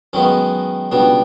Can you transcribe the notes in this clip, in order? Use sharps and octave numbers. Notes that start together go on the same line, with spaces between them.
F#2 D#3 G#3 B3 C#4
C#2 B2 G3 B3 D4